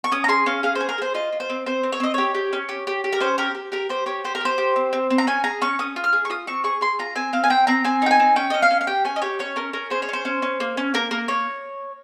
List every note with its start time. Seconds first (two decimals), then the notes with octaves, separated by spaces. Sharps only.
0.04 C#6
0.12 C#4 D#6
0.24 A#5
0.28 G#4 C6
0.46 C#4 F5
0.63 G#4 F5
0.75 C5
0.81 G#4
0.89 A#4
0.98 G#4 C5
1.14 F4 D#5
1.32 F4
1.40 C5
1.50 C4
1.66 C4 C5
1.83 C4
1.92 C#5
2.00 C4 D#5
2.14 G4 C#5
2.35 G4
2.53 C#4
2.69 G4
2.87 G4
3.04 G4
3.13 A#4
3.20 C#4 C5
3.38 G4 A#4
3.55 G4
3.72 G4 A#4
3.89 G4 C5
4.06 G4 C#5
4.24 G4 C5
4.35 A#4
4.41 G4 C5
4.58 G4
4.76 C4
4.93 C4
5.10 C4
5.18 A#5
5.27 C#4 G#5
5.44 G#4 A#5
5.62 C#4 C#6
5.79 C#4 D#6
5.96 F4
6.04 F6
6.13 G#4
6.25 C#6
6.30 F4 D#6
6.47 C4 C#6
6.64 G#4 C#6
6.81 G#4 C6
6.99 F4 A#5
7.16 C4 G#5
7.33 C4 F5
7.44 G#5
7.50 C4 G5
7.67 C4 A#5
7.84 C4 G#5
8.02 D#4 G5
8.11 G#5
8.20 C4
8.36 C#4 G5
8.50 C#4 D#5
8.62 F5
8.71 C#4
8.81 F5
8.87 G4 G5
9.05 C#4 G#5
9.16 D#5
9.22 G4 C#5
9.39 C#4 C#5
9.56 C#4 A#4
9.73 C#4 A#4
9.90 G#4 C5
10.02 C#5
10.09 C#4 C5
10.25 C#4
10.42 C#4
10.60 A#3
10.77 C#4
10.94 A#3 A#4
11.11 A#3 A#4
11.28 A#3 C#5